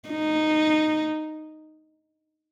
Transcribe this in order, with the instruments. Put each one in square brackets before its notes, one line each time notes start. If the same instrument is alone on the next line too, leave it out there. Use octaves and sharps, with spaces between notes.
[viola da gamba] D#4